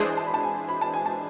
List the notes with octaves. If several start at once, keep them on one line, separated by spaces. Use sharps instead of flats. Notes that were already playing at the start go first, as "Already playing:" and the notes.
Already playing: E3 G#3 D4 G#4 C5 E5
A5
B5
A5
G#5
B5
A5
G#5
A5